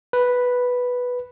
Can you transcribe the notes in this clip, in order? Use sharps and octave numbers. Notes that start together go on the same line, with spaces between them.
B4